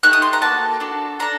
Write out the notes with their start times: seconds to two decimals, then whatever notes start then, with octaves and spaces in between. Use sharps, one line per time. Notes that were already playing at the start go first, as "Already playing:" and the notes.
0.03 A3 D#4 G4 F#6
0.13 D#6
0.22 C6
0.33 A#5
0.41 A#3 F#4 A4 A5
0.80 D4 F#4 A4
1.20 D4 A4 A#5